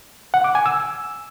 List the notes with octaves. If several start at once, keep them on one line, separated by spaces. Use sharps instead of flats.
F#5
D6
G#5
E6